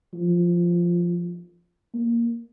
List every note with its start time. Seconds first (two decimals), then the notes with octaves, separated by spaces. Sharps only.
0.14 F3
1.94 A#3